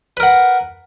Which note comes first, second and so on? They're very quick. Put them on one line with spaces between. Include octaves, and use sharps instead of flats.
B4 A#4 F#5